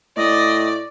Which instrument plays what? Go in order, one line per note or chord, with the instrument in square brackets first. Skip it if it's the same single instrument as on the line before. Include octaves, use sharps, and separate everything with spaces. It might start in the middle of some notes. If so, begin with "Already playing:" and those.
[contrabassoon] A2 [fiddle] D5 [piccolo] D#5